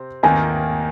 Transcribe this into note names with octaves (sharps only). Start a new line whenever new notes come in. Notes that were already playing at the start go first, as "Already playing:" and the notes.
Already playing: C3 C4
D#2 D#3 A#3 G#5